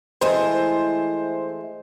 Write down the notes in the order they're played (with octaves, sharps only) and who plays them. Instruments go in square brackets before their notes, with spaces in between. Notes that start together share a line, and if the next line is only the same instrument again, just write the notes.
[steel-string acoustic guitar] E3 G#3 A3 [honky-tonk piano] C5